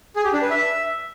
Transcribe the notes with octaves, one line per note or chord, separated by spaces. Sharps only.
G#4
G4
D4
B4
E5